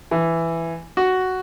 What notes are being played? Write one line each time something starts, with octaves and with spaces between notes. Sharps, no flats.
E3
F#4